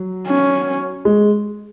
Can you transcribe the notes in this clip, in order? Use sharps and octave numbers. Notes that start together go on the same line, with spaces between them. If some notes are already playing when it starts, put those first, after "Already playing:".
Already playing: F#3
C#4
G#3